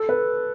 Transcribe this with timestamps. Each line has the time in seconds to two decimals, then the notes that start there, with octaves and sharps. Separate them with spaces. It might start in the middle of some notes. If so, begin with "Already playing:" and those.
Already playing: A4
0.09 B4